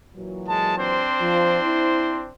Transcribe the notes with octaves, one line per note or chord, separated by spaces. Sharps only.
A#2 E3 F#3
G#3 A5
C4 D4 C5
F3
E4